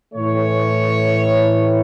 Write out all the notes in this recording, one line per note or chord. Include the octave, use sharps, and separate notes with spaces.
A2 E3 A3 C#5